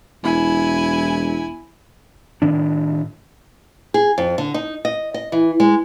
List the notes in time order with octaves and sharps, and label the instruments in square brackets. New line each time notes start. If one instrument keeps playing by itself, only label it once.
[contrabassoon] E1 [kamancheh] E4 G#5
[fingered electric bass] A2 D#3 D4
[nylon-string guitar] G#4
F2
D3
D#4
D#5
D#5
E3
G#3